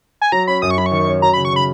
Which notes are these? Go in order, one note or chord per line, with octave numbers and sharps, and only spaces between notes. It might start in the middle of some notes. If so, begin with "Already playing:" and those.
G#5
F#3 A#5
C#4 B5
F#2 D#6
C#6
F#3 B5
C#6
D#3
C#4
F#3 A#5
B5
C#3
C#6
C#3 B5